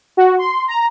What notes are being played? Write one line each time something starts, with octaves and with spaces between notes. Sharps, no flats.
F#4
C6
A#5